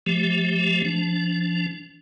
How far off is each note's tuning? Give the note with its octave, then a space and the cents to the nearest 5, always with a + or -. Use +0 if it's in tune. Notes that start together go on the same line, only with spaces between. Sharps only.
F3 +0 A3 -35 G4 +0
F3 -20 D4 -20